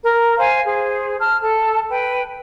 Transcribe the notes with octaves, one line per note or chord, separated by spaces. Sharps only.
A#4
C5 F5 G#5
G#4 C5
A5 F6
A4 A5
B4 G5